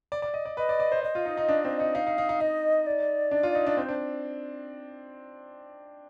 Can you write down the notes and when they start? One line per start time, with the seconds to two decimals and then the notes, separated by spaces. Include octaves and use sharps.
0.12 D5
0.22 D5
0.34 D#5
0.46 D5
0.57 B4 D#5
0.69 D5
0.80 D5
0.92 C5
1.03 C5 D#5
1.15 F4
1.26 D#4
1.37 D#4
1.49 D4
1.65 C4
1.80 D#4
1.94 D#4 F5
2.07 D#4
2.18 D#4
2.29 D#4
2.40 D#4 D#5
2.86 D5
3.31 D4
3.43 F4
3.55 D#4
3.66 D4
3.77 C4 C5
3.89 D4